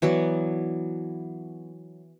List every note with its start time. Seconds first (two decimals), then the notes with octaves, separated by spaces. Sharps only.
0.02 E3 F#3 B3 D5